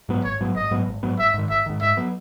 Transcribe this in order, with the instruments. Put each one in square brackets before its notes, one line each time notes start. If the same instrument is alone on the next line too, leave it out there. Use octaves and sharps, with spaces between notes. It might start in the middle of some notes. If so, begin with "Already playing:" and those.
[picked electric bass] G#2 F#3 B3
[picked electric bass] G#1 [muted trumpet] C#5
[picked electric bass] G#2 F#3 B3
[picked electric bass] G#1 [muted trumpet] D#5
[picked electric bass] G#2 F#3 B3
G#1
G#2 F#3 B3
[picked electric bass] G#1 [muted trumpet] E5
[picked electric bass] G#2 D#3
[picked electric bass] G#1 [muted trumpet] E5
[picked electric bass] G#2 D#3
[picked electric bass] G#2 [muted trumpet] E5
[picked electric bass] F#3 B3